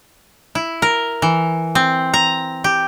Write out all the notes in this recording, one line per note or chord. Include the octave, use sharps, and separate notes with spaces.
E4
A#4
E3
C4
A#5
G4